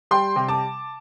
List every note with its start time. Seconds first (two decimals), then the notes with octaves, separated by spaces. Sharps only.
0.11 G3 G5 C6
0.36 C3
0.48 A5 D6